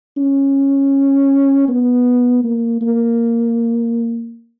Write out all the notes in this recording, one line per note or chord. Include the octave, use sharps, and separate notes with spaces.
C#4
B3
A#3
A#3